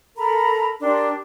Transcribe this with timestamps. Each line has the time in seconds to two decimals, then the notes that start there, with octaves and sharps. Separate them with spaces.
0.17 A4 A#4 A#5 B5
0.80 D4 G4 A#4 C6